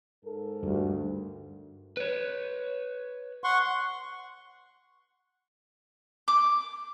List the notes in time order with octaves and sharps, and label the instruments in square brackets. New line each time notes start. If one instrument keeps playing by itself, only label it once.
[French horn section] G#2 A4 A#4
[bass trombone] D2 [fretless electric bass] G2
[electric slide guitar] B4 C#5
[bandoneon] F#5 C6 C#6
[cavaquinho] D6